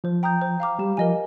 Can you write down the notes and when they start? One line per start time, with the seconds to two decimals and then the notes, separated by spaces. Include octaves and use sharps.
0.04 F3 C5
0.23 G5 A#5 D#6 G6
0.42 C5
0.60 F5 A#5 D6 F6
0.79 G3 G4
0.97 F3 A#4 D#5 G#5